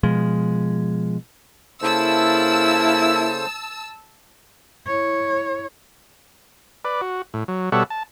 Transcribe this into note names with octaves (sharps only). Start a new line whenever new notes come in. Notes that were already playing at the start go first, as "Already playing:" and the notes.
B2 F3 G#3
C#3 A#3 E4 A4 C5 A5 E6
E4 C#5
B4 D5
F#4
A2
F#3
B2 G3 A4 C#5 E5 F#5
A5